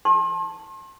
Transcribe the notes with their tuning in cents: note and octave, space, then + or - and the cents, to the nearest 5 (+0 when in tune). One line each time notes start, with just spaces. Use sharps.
A5 +0 C6 +40